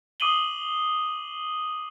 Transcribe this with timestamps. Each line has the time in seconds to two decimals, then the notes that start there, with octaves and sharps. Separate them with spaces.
0.20 D6 D#6 C7 D#7 F#7 G7